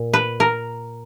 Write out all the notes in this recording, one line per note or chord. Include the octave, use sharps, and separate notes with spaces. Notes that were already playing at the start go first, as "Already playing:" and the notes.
Already playing: A#2
B4
A#4